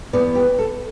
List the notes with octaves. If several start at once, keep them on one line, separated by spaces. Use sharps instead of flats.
E2 B2 B3 D5
G4
A4